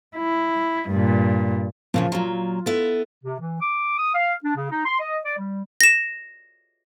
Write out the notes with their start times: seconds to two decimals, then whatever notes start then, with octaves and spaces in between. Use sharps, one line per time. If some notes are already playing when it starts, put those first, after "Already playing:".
0.16 E4
0.89 G2 A#2
1.94 A#2 C#3 E3 F3
2.12 A#2 F#3 F4
2.66 B3 E4 A4 E5
3.24 C3
3.40 E3
3.61 D6
3.98 D#6
4.15 F5
4.44 D4
4.56 C#3
4.71 D#4
4.85 C6
4.99 D#5
5.25 D5
5.38 G3
5.81 A#6 E7